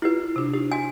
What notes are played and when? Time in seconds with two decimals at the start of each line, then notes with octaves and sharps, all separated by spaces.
0.02 E4 F4 G4 B4
0.36 C3 D4
0.54 D#4 G4
0.72 F#4 G#5